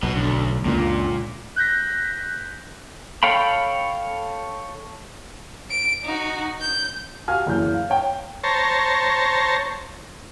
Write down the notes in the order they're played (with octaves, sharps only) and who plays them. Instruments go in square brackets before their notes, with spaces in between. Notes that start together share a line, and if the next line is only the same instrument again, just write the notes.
[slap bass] B1 [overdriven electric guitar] B2 B3
[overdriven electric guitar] D2 D3
[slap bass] C#2 F#2 D3 [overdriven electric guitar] A#2
[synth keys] F#6 G6 A#6 B6
[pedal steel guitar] A4 C#5 F5 G5 B5
[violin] D7
D#4 F#4
G6
[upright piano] F#4 G4 F5 G#5 F6
F#1 E3 G6
F5
C#5 G5
[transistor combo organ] C5 C#5 A5 A#5